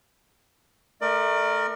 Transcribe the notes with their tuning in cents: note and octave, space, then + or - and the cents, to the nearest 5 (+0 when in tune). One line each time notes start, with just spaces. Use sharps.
A3 +0 A#4 +0 D5 +35